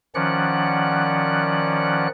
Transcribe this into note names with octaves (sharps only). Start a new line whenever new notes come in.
D#3 F3 C#4 D5 F#5 F#6